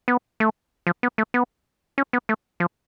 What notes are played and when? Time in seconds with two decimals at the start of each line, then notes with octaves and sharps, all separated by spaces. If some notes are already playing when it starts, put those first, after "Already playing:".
0.08 B3
0.40 A3
0.87 F3
1.03 B3
1.18 A3
1.34 B3
1.98 C#4
2.13 B3
2.29 A3
2.60 F3